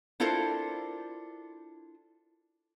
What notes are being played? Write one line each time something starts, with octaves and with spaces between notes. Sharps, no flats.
D4 E4 F4 A4 A#4 C5